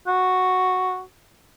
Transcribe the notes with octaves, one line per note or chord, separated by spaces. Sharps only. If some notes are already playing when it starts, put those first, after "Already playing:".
F#4